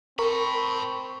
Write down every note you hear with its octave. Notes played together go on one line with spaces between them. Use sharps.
C4 A#4 A5 B5 C#6